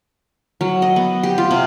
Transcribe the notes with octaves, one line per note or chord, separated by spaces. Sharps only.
F#3
D#5
B3
G4
F4
C3